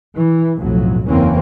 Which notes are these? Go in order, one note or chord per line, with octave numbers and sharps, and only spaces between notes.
E3
B1 F2 A2 F#3
F#1 E2 E3 A#3 C4 C#4